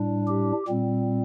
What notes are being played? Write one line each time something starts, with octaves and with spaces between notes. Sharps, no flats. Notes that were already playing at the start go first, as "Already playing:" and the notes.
Already playing: A2 G3 D4
G4
A#2 G3 C4